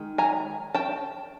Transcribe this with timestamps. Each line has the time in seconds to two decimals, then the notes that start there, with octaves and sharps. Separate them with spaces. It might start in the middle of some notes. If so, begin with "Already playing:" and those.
Already playing: D#3 G#3
0.18 G#5 A#5
0.74 G5 A5